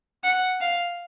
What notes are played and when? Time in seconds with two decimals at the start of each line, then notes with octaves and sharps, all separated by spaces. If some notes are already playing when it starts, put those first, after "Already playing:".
0.24 F#5
0.61 F5